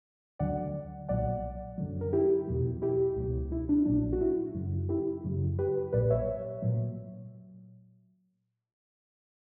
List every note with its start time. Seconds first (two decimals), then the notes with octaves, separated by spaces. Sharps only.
0.39 D2 D3 F#3 D5 F#5
1.09 B1 A#2 F#3 D5 F#5
1.78 F#2 D3 F#3
2.01 A#4
2.13 E4 G4
2.47 E2 B2 F#3
2.82 E4 G4
3.16 C#2 B2 F#3
3.52 E4
3.69 D4
3.85 A#1 A#2 F#3 D4
4.13 F#4
4.21 E4
4.55 F#2 C#3 F#3
4.89 E4 G4
5.24 F#2 C#3 F#3
5.59 G4 B4
5.93 A#1 A#2 F#3 B4 D5
6.10 C#5 E5
6.62 A#2 F#3